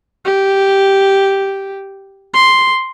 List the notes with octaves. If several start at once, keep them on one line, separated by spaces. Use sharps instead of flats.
G4
C6